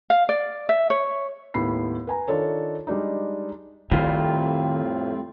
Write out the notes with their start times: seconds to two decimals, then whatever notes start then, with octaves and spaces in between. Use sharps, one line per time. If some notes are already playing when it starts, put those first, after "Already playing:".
0.10 F5
0.29 D5
0.69 E5
0.90 C#5
1.54 D#2 A2 B3 B5 C7
2.07 B4 G#5 A#5
2.28 D#3 D4 F4 A4 C#5
2.87 G3 G#3 D4 D#4
3.91 F2 A2 D#3 G3 C4 F4